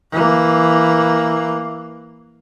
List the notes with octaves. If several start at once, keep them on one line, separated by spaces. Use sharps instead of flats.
E3 A#3